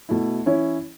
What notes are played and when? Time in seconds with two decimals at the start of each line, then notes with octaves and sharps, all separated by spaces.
0.09 B2 A3 E4
0.46 E3 C#4 E4 C#5